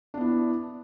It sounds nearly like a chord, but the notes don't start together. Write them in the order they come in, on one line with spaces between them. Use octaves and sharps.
D4 B3 E4